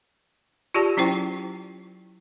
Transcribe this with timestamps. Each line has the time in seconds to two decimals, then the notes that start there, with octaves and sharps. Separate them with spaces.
0.74 F4 G4 G#4 D5 A5
0.97 F#3 C#4 E4 C5 G5